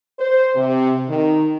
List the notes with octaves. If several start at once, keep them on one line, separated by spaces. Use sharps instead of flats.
C5
C3
D#3